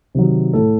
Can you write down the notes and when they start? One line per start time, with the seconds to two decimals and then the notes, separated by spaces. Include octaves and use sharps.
0.15 C3 D#3 F#3
0.54 A2 A4